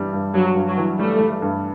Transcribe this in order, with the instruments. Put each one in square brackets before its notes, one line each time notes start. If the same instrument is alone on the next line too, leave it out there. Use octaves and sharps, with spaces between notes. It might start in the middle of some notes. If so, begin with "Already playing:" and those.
Already playing: [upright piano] G2 E3 G3
G2
[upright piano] G2 [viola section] F#3
[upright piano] G2
[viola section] F#3
[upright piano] E3
[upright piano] G3 [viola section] A3
[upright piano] G3
G2